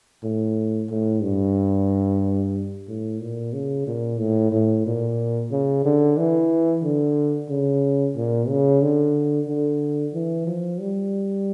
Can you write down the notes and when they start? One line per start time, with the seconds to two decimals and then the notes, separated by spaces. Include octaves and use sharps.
0.24 A2
0.90 A2
1.23 G2
2.88 A2
3.21 A#2
3.54 C#3
3.87 A#2
4.19 A2
4.52 A2
4.86 A#2
5.51 C#3
5.85 D3
6.18 E3
6.84 D3
7.50 C#3
8.16 A#2
8.49 C#3
8.82 D3
9.48 D3
10.14 E3
10.47 F3
10.80 G3